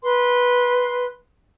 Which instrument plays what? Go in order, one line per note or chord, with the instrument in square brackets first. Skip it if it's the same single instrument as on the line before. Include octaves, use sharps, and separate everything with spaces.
[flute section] B4 C6